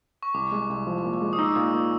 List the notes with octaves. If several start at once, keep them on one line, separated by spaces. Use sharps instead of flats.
C#6
C2 D6
G#3
C2
F3
A#2
G#3
D#6
D#4 E6
A#2
A#2